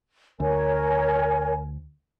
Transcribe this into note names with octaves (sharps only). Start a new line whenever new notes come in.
D2 A#4 C#5 G#5